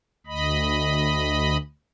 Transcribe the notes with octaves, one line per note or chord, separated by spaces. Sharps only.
D2 D#5 B5